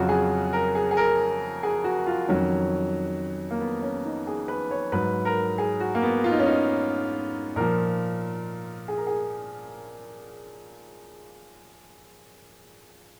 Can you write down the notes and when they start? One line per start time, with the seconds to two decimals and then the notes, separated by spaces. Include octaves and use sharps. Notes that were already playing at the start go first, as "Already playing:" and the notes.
Already playing: F2 C#3 F#3 F4 F#4
0.09 G#4
0.53 A#4
0.75 G#4
0.91 G#4
0.97 A#4
1.63 G#4
1.84 F#4
2.07 F4
2.28 F2 D#3 F#3 C#4
3.51 A#3
3.60 B3
3.82 C#4
4.05 D#4
4.27 G#4
4.48 B4
4.71 C#5
4.92 G#2 F#3 B4
5.25 A#4
5.58 G#4
5.80 F#4
5.95 A#3
6.02 B3
6.24 F4
6.31 D#4
6.39 C#4
6.46 D#4
7.56 A#2 F3 A#4
8.88 G#4
8.97 A#4
9.07 G#4